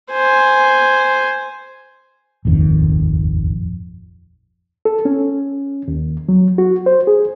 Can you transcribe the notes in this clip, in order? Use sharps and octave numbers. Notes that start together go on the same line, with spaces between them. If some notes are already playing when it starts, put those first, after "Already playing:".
C5 G#5
D#1 G#1 F2 D#3
A4
C#4
D#2
F#3
F#4
C5
G#4